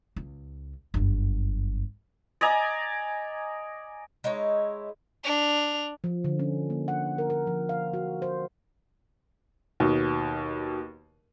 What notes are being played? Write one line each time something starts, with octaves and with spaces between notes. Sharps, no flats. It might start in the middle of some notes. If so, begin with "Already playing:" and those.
C#2
G1 F#2
D5 D#5 G#5 A#5
G#3 D#4 E4 C#5
D4 F7
F3
D3
C#4
A#3
F#5
A#4
A#4
F3
F5
F#4
C5
D#2 B2